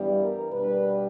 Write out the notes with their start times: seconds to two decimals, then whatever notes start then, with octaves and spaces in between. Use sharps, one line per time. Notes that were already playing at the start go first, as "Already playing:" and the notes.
Already playing: G2 E3 G3 B3
0.20 A#4
0.52 B2 G3 B3 D4 B4